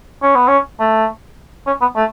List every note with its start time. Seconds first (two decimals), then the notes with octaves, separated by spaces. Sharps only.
0.22 C#4
0.35 B3
0.48 C#4
0.80 A3
1.67 C#4
1.81 B3
1.96 A3